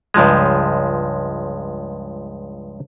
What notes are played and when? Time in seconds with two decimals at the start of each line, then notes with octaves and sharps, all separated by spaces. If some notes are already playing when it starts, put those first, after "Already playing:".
0.14 C#2 G2 F3 G#3